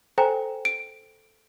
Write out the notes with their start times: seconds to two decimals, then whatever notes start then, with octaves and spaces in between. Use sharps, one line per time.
0.18 A4 C5 G5 G#5 A#5
0.65 D7